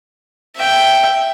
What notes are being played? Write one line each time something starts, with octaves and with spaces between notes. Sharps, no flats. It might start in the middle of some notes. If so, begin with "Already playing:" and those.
E5 G5